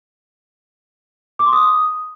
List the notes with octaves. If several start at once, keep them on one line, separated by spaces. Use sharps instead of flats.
D6
C6
D#6